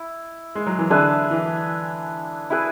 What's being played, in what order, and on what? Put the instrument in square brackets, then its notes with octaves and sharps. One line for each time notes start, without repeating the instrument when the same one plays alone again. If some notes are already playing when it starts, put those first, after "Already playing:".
Already playing: [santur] E4
[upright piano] G#3
F#3
E3
[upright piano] D3 [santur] D4 G#4 B4 E5
[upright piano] E3
[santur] E4 G#4 B4